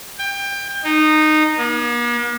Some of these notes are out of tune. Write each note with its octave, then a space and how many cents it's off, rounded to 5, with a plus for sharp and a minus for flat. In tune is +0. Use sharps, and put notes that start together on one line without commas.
G5 +25
D#4 -15
A#3 +45